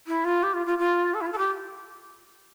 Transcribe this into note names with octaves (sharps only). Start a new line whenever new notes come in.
E4
F4
G4
F4
F4
F4
A4
E4
F4
A4
G4